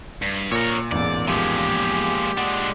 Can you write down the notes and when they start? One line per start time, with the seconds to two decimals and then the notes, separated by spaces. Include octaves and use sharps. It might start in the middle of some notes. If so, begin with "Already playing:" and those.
0.22 G2
0.52 A#2 A#4 C#5 C#7
0.92 A1 E2 G#2 D5
1.28 F3 G#3 G4
2.37 G#3 D4 F#5